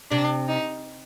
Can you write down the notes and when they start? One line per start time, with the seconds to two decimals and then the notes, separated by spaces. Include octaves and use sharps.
0.11 C3 D4
0.48 D#4